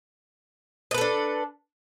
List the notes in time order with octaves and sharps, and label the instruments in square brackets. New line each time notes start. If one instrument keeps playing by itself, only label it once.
[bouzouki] D#5
B4
A4
D4